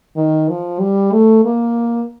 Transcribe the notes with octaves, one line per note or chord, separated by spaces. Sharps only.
D#3
F3
G3
A3
A#3